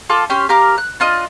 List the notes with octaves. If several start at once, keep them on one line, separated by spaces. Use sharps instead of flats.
F4 A4 A5 D6
C#4 G4 C6
G4 A#4 F5 D6
F#6
D4 F4 D#5